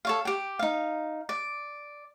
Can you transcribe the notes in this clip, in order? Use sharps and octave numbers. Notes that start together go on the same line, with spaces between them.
A4 C#5 F5
G4 G5
D#4 F5
D5